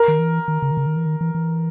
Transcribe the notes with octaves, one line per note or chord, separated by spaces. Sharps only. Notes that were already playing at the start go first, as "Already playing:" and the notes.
Already playing: A#4
D#3
E3
D#3
C#3
D#3
C#3
D#3
E3
D#3
E3
E3